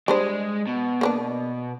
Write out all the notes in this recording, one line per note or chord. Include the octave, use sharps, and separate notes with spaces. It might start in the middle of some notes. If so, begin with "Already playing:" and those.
G3 G#3 D4 C5
B2
A#3 B3 D4